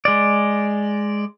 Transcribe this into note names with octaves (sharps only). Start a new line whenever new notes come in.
G#3 D5